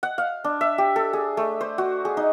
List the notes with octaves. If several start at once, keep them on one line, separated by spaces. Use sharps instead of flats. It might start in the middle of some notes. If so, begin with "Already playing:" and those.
F#5
F5
D4
E5
G4
A4
G#4
A3
C5
F#4
G#4
D#4